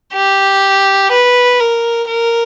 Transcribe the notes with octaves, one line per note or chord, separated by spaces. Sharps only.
G4
B4
A#4
A#4